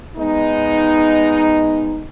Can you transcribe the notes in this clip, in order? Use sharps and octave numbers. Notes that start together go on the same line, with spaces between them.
G#3 B3 D#4